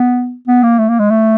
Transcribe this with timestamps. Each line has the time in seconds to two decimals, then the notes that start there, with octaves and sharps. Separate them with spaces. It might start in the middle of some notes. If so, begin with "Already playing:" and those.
Already playing: B3
0.48 B3
0.63 A#3
0.79 A3
0.89 A#3
0.99 G#3
1.10 A3